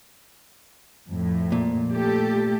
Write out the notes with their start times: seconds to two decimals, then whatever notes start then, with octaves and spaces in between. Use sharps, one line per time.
1.10 F2 A2
1.52 A#2
1.91 A3 G4 A4